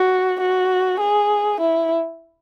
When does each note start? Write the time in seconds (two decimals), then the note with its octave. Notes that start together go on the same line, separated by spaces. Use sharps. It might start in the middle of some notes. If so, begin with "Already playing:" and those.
Already playing: F#4
0.40 F#4
1.00 G#4
1.61 E4